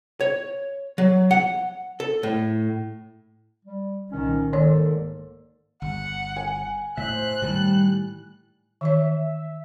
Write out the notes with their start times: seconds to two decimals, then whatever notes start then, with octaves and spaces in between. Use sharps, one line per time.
0.21 C#5
0.98 F#3
1.31 F#5
2.00 A4
2.23 A2
3.65 G3
4.12 C2 A#2 D#3 C#4
4.53 G#2 D#3 A#3 A4 D5
5.82 G1 F#5
6.36 G#5
6.97 A2 C5 E5 F#6
7.42 A2 D#3 E3 G3 A5
8.81 D#3 E3 C#5 E5